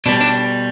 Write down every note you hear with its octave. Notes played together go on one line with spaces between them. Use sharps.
B2 G3 D4
D4